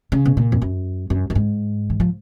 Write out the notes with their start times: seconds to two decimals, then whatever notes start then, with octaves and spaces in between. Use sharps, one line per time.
0.12 C#3
0.25 B2
0.37 A#2
0.52 F2
0.62 F#2
1.10 F#2
1.30 F#2
1.35 G#2
1.90 D#3
2.00 F3